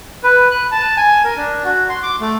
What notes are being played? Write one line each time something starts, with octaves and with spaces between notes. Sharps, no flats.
B4
F#6
A5
G#5
A#4
D4
F#4
C6
D6
A3